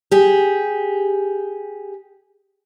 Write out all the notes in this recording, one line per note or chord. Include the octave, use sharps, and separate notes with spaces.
G4 G#4